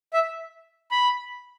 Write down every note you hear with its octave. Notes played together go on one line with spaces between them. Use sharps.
E5
B5